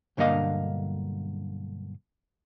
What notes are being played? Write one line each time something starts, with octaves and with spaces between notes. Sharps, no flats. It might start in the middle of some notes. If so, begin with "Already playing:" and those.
B1 G2 D3 A#3 D#5 F5